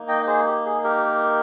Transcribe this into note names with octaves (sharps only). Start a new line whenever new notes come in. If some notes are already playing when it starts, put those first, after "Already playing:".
Already playing: A#3 D#4
D#5 G5
G#4 C5
G4
G#4
G4 A#4